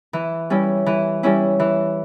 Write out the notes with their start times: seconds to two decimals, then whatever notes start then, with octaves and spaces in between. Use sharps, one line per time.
0.13 E3
0.50 G3 C#4 E4
0.86 E3
1.23 G3 C#4 E4
1.60 E3